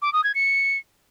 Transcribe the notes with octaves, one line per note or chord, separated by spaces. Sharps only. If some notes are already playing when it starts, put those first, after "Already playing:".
D6
D#6
G#6
C#7